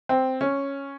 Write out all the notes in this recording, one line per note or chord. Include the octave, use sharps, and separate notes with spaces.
C4
C#4